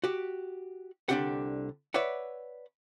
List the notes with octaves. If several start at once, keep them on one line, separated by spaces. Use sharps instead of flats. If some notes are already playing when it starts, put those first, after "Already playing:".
F#4 G4
C2 D3 D4 E4 G4 F#5
B4 C#5 D5 E5 F#5